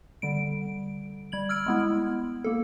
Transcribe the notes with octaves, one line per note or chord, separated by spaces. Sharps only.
D3 G3 D7
G3 G#6 F#7
E6 F6 G#6 D7
G#3 B3 E4
A#3 A4